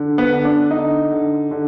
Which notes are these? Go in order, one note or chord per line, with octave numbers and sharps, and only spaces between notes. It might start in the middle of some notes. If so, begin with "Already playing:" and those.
Already playing: D3
B3
D3
D4
D3 D#4
D3
D3